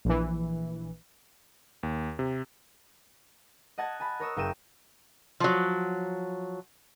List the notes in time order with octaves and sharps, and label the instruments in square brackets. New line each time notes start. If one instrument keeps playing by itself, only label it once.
[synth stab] A#1 E3
[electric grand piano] D#2
C3
[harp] D#5 F#5 A5 G#6
G#5 A5 B5
A#4 C#5 D#6 E6
F#1 A#4 G5 D#7 E7
[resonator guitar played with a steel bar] F3 F#3